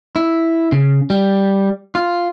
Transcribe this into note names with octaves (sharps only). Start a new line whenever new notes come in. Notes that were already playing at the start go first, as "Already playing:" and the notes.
E4
C#3
G3
F4